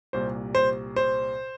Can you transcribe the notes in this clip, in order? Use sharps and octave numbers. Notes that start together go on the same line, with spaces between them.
C2 A#2 G3 C5
C5
C5